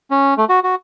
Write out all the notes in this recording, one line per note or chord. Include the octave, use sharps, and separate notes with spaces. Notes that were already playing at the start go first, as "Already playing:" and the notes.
C#4
A3
F#4
F#4